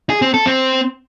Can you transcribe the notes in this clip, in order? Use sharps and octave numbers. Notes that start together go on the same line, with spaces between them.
G#4
C4
A4
C4